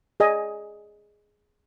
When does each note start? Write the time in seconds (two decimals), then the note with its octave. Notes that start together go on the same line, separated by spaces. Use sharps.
0.20 G#4 D5 D#5 G#5